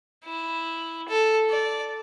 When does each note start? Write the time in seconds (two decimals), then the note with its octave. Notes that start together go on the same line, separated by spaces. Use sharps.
0.25 E4
1.08 A4
1.50 D5